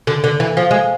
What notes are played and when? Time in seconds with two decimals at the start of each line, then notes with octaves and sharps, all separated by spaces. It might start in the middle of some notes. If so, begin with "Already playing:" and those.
0.07 D3
0.24 D3
0.40 E3
0.57 F3
0.71 G#3